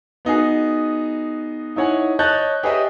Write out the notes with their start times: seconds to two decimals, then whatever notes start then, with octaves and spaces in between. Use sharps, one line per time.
0.25 B3 D#4 F#4 G#4
1.76 D#4 E4 C#5 F#5 G#5
2.19 C#5 D#5 A5 F#6 G6 A6
2.63 G4 G#4 B4 C#5 D#5 E5